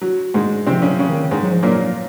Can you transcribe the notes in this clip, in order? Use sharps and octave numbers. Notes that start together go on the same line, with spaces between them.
F#3
G#2 G#3
C3 F3 C4
C#3 C#4
F#3
C#3 C#4
D#3
G#2 G#3
F#3
F3
A#2 F#3 A#3